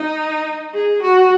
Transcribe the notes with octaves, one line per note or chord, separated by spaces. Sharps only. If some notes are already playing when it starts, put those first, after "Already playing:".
Already playing: D#4
G#4
F#4